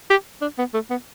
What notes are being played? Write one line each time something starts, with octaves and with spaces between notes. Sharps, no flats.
G4
D4
B3
A3
B3